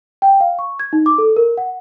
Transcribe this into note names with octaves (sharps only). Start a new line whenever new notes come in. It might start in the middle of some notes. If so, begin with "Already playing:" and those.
G5
F5
C#6
G#6
D#4
D6
A4
A#4
F#5